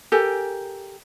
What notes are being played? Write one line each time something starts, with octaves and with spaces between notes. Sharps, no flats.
G4 A4 A#4 G#5